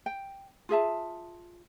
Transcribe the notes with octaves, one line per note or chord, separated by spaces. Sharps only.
G5
F4 G#4 E5 A5